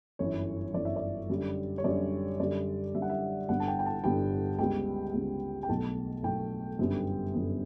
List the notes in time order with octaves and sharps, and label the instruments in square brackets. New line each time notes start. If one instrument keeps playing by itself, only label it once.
[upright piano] G1 F#2 E3 C#5
G1 F#2 E3 D5
E5
D5
F#2 D3 G3
C#5
F#2 D3 G3 D5
F#2 D3 G3 D5
F#2 D3 G3 E5
F#5
E5
G1 G2 D3 G3 B3 F#5
A5
G5
G5
A5
G1 G2 D3 G3 B3 G5
C#2 C#3 G3 B3 G5
C#2 C#3 G3 B3
G5
B1 B2 A3 A5
B1 B2 A3 G5
G1 F#2 D3 G3 B3
G1 F#2 D3 G3 B3